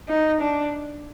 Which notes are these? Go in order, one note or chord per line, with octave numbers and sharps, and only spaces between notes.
D#4
D4